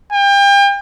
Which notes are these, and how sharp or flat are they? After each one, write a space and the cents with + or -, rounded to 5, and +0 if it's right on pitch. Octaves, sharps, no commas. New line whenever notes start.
G5 +35